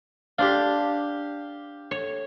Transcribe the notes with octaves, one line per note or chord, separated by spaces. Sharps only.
D4 G4 C5 F5
C#5